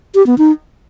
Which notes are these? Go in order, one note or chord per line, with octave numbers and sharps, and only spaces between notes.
G4
B3
D#4